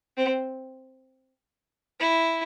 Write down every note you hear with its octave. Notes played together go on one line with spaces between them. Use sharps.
C4
E4